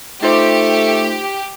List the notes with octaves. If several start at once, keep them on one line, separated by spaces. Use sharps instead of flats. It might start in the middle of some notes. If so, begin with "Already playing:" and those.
A3 D#4 F4 G4 C5